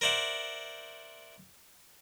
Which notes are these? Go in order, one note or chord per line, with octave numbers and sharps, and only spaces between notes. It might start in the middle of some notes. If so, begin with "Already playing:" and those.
A#4 C5 D5 E5 F#5